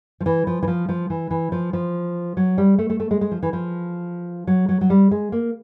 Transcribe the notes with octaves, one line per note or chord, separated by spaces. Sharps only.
F3
E3
F3
E3
F3
F3
E3
E3
F3
F3
F#3
G3
A3
A3
A3
G#3
G#3
F3
E3
F3
F#3
F#3
F#3
G3
G#3
A#3